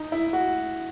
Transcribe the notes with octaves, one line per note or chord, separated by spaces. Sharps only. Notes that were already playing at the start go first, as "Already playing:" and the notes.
Already playing: D#4
E4
F#4